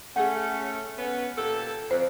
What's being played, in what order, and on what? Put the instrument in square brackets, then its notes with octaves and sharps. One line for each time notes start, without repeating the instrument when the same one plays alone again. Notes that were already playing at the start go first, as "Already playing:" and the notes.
[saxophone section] A3 C#4 [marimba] G#4 F#5
[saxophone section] B3 C#4
A#2 G4 A4
[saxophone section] F2 [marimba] C5